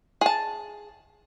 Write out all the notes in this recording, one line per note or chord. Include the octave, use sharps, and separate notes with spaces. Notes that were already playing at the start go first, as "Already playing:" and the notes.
G#4 A5